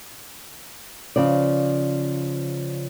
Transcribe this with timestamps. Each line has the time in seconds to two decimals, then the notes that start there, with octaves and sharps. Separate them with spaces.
1.16 C#3 F3 D5